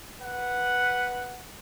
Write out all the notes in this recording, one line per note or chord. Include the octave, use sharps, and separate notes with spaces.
B4 F#5